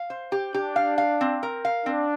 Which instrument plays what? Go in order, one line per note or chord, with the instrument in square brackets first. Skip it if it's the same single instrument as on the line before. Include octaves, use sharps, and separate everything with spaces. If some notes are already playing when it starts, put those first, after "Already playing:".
Already playing: [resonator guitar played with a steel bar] F5
C5
G4
[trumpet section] D4 [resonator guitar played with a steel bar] G4
[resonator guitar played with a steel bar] F5
F5
C4
A#4
F5
[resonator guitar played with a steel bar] C4 [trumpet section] D4